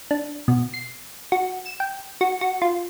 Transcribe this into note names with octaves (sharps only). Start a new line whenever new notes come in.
D4
B2
C7
F#4
E7
G5
F#4
F#4
F4